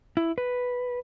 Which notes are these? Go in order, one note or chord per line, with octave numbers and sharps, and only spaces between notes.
E4
B4